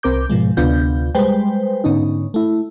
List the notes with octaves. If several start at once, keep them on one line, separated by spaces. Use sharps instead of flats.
C2 C4 A#4 D6 G6
G#2 B2 F3 G#3
D2 C3 B3 D4 F4 G6
G3 G#3 B4 C5 G5
G#2 D3 B3 C#4 D#4
A3 E4